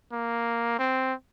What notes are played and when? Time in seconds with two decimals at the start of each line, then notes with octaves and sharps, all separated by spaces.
0.13 A#3
0.79 C4